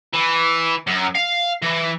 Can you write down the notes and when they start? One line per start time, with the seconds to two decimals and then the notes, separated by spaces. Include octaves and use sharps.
0.13 E3
0.87 F#2
1.15 F5
1.62 E3